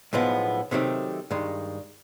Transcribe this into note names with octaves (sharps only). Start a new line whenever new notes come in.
B1 A2 F3 G#3 B3
C3 D#3 F#3 A3 C4
G2 D#3 G#3